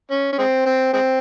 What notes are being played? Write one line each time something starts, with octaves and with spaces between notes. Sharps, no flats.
C#4
C#4
G#3 C4
C4
G#3 C4